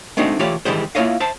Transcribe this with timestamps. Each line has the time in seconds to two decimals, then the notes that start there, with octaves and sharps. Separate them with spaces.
0.17 G#3 A3 C4 D4 D#4 F#4
0.39 E3 A3 F4 G4 C#5 D5
0.65 D#3 E3 G3 G#3 C5
0.95 A#3 E4 F4 C#5 D#5 F5
1.20 C5 E5 A5